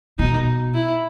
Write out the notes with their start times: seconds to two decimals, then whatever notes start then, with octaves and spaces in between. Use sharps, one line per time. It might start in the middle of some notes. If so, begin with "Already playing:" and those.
0.19 B2 D#4
0.74 E4